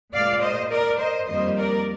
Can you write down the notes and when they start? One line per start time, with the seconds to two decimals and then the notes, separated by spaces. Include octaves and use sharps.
0.14 A#2 G#3 D5 F5
0.42 C5 D#5
0.71 A#4 D5
1.00 C5 D#5
1.28 F2 D#3 G3 A#3 C5 D#5
1.57 A#4 D5